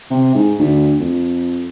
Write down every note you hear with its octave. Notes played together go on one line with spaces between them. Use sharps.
C3
G#2
D2
F2